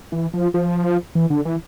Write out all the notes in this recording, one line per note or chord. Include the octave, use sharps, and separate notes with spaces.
E3
F3
F3
E3
D3
E3